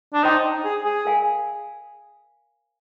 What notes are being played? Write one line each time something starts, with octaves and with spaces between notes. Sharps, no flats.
D4
D#4 C5 G5 C6
G#4
G#4
A#4 F5 G#5